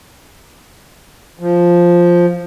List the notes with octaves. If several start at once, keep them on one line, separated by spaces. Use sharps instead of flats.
F3